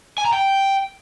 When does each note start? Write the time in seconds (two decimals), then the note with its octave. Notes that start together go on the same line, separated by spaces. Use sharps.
0.18 G#5
0.25 A#5
0.33 G5